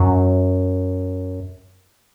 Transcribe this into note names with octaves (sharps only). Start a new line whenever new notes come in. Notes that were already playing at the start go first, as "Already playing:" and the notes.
Already playing: F#2